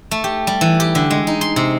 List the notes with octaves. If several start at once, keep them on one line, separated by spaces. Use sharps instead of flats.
A3
G4
G3
E3
G4
D3
G#3
D#4
C6
C3